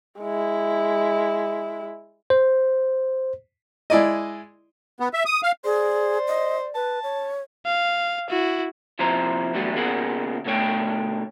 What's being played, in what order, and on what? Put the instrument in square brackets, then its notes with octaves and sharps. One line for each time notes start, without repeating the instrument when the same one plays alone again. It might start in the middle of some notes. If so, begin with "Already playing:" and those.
[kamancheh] G#3 E4
[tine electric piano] C5
[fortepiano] G#3 E4 D5 D#5
[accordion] B3
E5
D#6
F5
[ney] G#4 [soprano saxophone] C5 [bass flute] D5
[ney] D#5
[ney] B4 [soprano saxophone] A5
[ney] C#5
[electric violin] F5
E4 F#4
[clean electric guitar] D#2 C3 F3 E4 C5 A#5
E2 A2 D3 F#3 G3 B3
A#2 C#3 B3 G#4 A#4 F#5
B2 D3 A3 C#5 G5